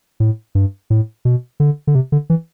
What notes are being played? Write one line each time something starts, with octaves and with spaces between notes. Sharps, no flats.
A2
G2
A2
B2
D3
D3
C3
D3
E3